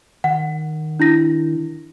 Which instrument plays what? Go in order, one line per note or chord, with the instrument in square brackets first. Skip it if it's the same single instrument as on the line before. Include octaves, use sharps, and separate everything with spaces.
[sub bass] D#3 [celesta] F#5
[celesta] D4 E4 A#6